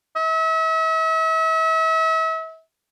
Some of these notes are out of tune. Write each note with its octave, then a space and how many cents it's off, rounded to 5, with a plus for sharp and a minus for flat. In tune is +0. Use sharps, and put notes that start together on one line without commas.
E5 -40